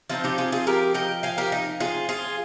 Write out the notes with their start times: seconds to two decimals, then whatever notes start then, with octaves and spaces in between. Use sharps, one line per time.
0.09 F3 C4 D#4 F4
0.24 D#4 G4
0.38 F4 G#4
0.52 F4 G#4
0.67 G4 A#4
0.94 D#5 G5
1.23 F5 G#5
1.38 G4 A#4
1.52 D#4
1.80 F4 G#4
2.09 F4 G#4